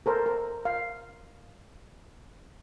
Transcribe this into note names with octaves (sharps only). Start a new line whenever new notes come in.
A4 A#4 C5
A#4
F5